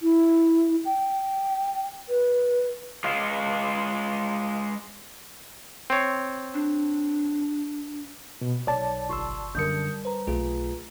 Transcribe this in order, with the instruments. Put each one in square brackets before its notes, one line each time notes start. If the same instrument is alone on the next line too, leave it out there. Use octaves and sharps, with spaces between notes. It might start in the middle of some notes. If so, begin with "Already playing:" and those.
[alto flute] E4
G5
B4
[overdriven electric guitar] G#3 F4
[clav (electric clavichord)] C4 C#5
[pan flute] D4
[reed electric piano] B2
[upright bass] B1 [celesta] C#5 [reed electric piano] D5 A5
[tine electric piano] G1 C6 E6 [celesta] C#6
[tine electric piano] F#2 D3 C#7 [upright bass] G3 [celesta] A#4 D#6 G6
[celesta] B4 A#5 [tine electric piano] C5
[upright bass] B1 [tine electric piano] A3 F4 G#4